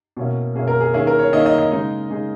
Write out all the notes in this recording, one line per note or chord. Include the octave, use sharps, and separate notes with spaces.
B2 A#3 C#4 E4
B2 A#3 C#4 E4 G#4
A#4
G#4
D#3 A#3 C#4 E4 G#4
A#4
C#5
D#3 A#3 C#4 E4 D#5
D#5
D#5
C#3 G#3 D#4
C#3 G#3 D#4 G#4